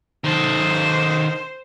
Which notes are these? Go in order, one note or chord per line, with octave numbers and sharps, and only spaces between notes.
D#3 A4 C5